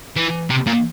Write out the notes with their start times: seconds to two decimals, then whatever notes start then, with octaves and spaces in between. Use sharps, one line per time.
0.16 E3
0.50 C3
0.66 A#2